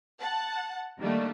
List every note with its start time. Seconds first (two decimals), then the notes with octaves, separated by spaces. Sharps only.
0.21 F#5 A5
0.99 D#3 G3 A3 A#3 D4